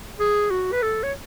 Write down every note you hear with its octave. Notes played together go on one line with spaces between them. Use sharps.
G#4
F#4
B4
A4
C#5